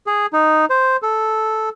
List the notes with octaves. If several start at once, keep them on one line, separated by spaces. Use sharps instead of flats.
G#4
D#4
C5
A4